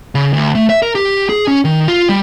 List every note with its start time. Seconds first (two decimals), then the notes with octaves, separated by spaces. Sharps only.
0.15 C#3
0.33 D2
0.55 A3
0.70 E5
0.82 A#4
0.95 G4
1.29 G#4
1.48 C#4
1.65 D#3
1.88 F4
2.09 G3